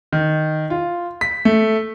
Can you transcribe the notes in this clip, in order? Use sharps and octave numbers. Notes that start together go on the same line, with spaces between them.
D#3
F4
B6
A3